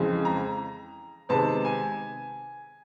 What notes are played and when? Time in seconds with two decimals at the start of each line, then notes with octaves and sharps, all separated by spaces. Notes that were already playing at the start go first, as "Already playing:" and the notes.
Already playing: F2 C#3 E3 G#3
0.25 A#5
1.29 C3 D#3 G#3 B3 A5
1.65 G#5